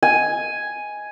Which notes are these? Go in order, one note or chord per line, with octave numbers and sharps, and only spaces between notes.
G#5